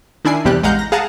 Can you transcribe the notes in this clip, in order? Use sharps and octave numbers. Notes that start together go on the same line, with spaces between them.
D#3 D4 E4 G#5 C7
E2 C3 G3 G4 F#6
A1 G#3 F5 F#5 A#5 G6
A#6
G#4 F5 F#5 A5 A#5